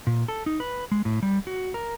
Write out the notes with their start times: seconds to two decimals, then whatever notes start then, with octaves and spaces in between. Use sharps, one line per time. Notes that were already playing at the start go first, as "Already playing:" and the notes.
0.07 A#2
0.28 A4
0.46 D#4
0.60 B4
0.91 G#3
1.05 A2
1.23 G3
1.47 F#4
1.74 A#4